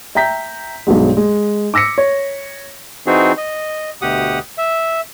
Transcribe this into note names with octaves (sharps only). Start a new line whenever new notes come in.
E5 G5 A#5 G6 B6
B1 G2 F#3 G#3
G#3
D6 E6 A#6 B6 C#7
C#5
E3 C4 D#4 F#4 G#4
D#5
D2 B2 G4 F#5 D#6
E5